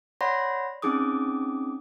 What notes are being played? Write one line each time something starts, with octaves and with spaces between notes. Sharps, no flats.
C#5 D5 F#5 B5 C6 A#6
C4 C#4 D#4 G#4 D6 D#6